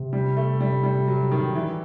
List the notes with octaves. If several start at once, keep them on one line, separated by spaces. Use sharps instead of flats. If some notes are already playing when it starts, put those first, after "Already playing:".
Already playing: C3
G3
A3
G3
G3
F#3
D#3
E3